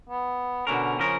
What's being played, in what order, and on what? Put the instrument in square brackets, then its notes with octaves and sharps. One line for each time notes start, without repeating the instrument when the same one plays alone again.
[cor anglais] B3
[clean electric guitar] B2 D3 A#4 [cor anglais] C#4
[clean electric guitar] C#3 F3 A#4 [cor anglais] C#4